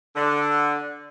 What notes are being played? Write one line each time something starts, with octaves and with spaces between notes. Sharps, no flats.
D3